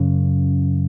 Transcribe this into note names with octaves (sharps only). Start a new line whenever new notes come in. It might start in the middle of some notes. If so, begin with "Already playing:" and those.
Already playing: F#2 C#3